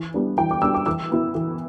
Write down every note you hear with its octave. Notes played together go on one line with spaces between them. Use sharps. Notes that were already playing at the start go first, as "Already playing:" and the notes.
Already playing: E3
G3 B3 D4
E3 G5
D6
G3 B3 D4 E6
D6
E3 E6
B3 E4
E3